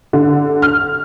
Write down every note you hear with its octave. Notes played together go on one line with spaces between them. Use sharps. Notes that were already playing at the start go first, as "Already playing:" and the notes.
D3
F6